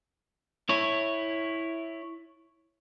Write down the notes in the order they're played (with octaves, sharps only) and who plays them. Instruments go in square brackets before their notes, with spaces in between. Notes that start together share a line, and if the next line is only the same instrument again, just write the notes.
[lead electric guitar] E4 C#5